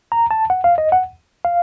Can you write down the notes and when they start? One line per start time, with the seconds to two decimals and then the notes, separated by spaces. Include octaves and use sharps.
0.12 A#5
0.31 A5
0.50 F#5
0.64 F5
0.78 D#5
0.92 F#5
1.45 F5